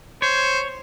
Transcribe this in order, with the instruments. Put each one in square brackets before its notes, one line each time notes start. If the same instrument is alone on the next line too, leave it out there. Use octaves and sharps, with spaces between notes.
[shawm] C5 [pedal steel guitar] C#5